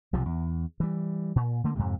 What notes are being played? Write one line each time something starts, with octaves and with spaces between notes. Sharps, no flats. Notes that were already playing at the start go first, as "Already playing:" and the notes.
B1 C3 F3
E2
E3 G3
A#2
D3 A3 A#3
F2 G#2 C3